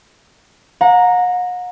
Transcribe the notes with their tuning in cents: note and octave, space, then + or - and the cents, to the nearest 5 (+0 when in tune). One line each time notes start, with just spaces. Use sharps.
F#5 -40 A#5 +0